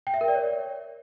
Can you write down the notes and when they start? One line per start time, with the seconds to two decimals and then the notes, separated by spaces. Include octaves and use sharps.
0.07 G5
0.14 E5
0.21 A#4
0.28 D5
0.35 C#5